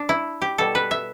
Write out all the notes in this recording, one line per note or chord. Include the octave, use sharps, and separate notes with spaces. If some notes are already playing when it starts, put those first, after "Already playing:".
Already playing: D4
E4
G4
B2 G3 A4
B4
E5